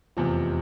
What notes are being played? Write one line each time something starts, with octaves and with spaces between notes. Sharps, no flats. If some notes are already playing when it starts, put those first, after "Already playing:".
F1 E2 C3 F3